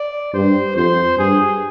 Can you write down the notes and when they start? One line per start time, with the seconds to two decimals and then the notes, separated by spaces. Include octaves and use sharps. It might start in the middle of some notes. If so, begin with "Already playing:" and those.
Already playing: D5
0.34 G2 C5
0.76 F2 C5
1.18 G2 G#4